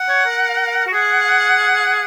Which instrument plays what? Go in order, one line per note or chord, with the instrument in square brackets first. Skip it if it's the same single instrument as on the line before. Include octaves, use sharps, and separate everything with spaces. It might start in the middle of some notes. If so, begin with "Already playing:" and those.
Already playing: [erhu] F#5
[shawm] C#5
A#4
F#4
[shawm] G#4 [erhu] F#5